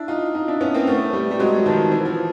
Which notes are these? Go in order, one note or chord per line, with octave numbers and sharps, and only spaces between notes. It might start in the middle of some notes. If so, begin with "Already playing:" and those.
Already playing: D4 E4
D#4 F4
D#4 F4
D4 E4
B3 C#4
A#3 C4
A3 B3
G3 A3
G3
F#3 G#3
F#3
D#3 F3
E3
F3